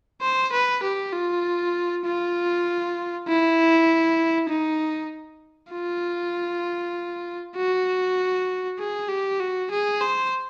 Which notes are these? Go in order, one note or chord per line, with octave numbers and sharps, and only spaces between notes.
C5
B4
G4
F4
F4
E4
D#4
F4
F#4
G#4
G4
F#4
G#4
C5